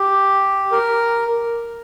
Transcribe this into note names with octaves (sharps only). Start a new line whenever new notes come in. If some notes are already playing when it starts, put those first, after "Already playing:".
Already playing: G4
A#4